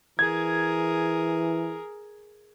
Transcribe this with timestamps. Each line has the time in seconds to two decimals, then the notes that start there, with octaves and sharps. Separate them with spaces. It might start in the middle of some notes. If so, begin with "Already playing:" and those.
0.19 E3 G#4 A#4 G#6